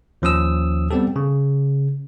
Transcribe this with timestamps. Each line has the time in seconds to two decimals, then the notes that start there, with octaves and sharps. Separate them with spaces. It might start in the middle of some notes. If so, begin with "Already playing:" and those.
0.22 D#2 F3 C#4 D#6 E6
0.91 G3 B3 C4 G4 A4
1.16 C#3